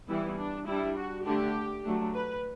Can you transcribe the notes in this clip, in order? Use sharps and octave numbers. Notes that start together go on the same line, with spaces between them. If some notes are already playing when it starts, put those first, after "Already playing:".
E3 G3 B3 E4
D4
G3 D4 E4
F#4
D3 A3 D4 G4
F#3 A3 D4
B4